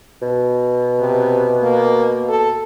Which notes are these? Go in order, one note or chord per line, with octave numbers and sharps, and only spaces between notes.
B2
C3
A#3
A4